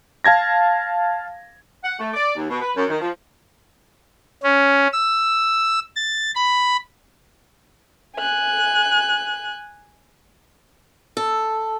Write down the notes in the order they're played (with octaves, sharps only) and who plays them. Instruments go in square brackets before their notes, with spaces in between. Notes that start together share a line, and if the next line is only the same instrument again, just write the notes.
[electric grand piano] F5 A5 G#6 A#6
[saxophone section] F#5
A3
D5
D#2
B2
B4
F#2
D#3
F3
[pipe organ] C#4
E6
A6
B5
[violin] G#5 F#6
[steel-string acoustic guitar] A4